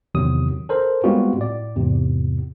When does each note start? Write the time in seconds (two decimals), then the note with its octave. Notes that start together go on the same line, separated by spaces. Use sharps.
0.14 E2 C3 D#3 F#3 D#6
0.69 A4 A#4 C5
1.04 G3 G#3 B3 C4 F4 F#4
1.38 A2 D5
1.76 E2 G#2 C3